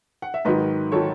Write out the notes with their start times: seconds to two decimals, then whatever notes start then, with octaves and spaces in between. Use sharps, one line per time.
0.22 F#5
0.34 E5
0.45 G#2 D#3 F#3 B4 D#5
0.92 D#3 F#3 A4 C#5